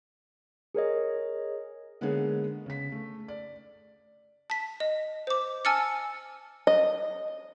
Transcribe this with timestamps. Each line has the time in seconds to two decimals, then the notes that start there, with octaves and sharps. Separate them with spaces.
0.75 G#4 A#4 C#5 D#5
2.01 D3 G#3 A#3 B3 G#4 C#5
2.66 C#3 B6
2.92 A3
3.28 D5
4.50 A5 B6
4.80 D#5
5.27 C5 D6
5.65 G#5 A5 E6 F6 A6 C#7
6.67 D#5